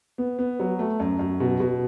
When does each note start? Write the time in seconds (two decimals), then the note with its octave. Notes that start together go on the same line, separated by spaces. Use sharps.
0.18 B3
0.39 B3
0.60 F#3
0.79 A3
1.00 F#2
1.19 F#2
1.40 B2
1.60 B2